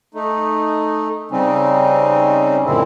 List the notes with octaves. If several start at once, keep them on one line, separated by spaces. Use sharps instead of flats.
A3 D#4
C#3 G3 C4 C#4 D#4
F#2 A#2 D3 G#3 C4 E4